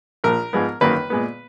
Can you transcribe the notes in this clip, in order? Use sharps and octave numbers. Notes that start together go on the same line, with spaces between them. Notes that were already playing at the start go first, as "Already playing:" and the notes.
A#1 A#2 F3 A#4
G#2 F3 G#3 B3
G#1 F#2 D#3 A#3 B4
A#2 G#3 B3